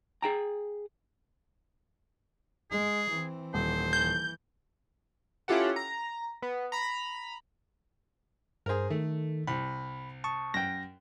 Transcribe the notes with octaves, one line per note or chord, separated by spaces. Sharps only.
G#4 G5 A#5
G#3 G#4
E3 C4
D#1 C5
E3 G6
C#4 E4 F4 G4 A4 F#5
A#5
B3
A#5 B5
G2 G#4 A#4 C5
D#3 A3 A4
C2 B5
A5 C#6 D#6
F#2 G5 A#6